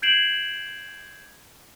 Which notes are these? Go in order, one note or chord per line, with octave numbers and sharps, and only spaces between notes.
G6 G#6 C7 D7 E7 F#7